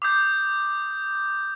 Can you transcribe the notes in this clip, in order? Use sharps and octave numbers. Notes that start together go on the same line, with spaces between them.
D6 D#6 G6